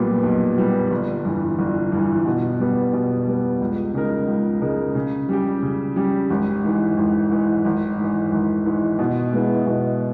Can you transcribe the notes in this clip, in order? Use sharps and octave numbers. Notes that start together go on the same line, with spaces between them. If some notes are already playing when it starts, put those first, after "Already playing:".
Already playing: B1 A#2 G3 B3
B1
A#2 G3 B3
G1
G2 E3
G1
G2 E3
B2
G3 B3
B2
G3 B3
C#2
C#3 G#3 D#4 A#4
C#2
C#3 G#3 D#4 A#4
C#3
G3 C#4 G4
C#3
G3 C#4 G4
G#1
G#2 E3
G#1
G#2 E3
G#1
G#2 E3
G#1
G#2 E3
B2
G#3 B3 E4
B2